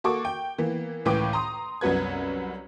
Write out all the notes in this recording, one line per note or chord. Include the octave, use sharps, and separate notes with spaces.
A#3 F#4 A4 C#6 D6
G5
E3 A#3 B3
C#2 A2 E3 B4 G5 D6
A#5 C6 D#6
C2 F#2 B3 F#4 B4 G#6